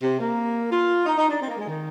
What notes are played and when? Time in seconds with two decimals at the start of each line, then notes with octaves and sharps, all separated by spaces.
0.01 C3
0.19 A#3
0.71 F4
1.05 D#4
1.17 D#4
1.28 D4
1.40 C4
1.48 A#3
1.57 G#3
1.66 D#3